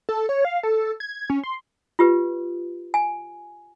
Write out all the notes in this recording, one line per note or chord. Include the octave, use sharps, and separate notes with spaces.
A4
C#5
F5
A4
G#6
C#4
C6
F4 G4 B4
G#5